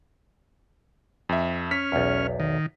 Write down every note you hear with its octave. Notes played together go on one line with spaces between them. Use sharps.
F2 E5
C#4 F6 B6
B1 E2
D#3